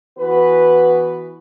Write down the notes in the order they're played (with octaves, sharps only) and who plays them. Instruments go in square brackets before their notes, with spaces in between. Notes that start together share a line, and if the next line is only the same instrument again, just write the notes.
[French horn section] E3 B3 F#4 B4